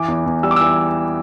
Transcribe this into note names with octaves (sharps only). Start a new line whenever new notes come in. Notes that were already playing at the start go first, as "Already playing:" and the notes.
Already playing: E3 D6
E2
E2
G3 E6
D6
E3 E6